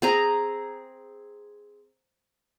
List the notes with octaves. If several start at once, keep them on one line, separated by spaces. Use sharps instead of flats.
C4 G#4 A#5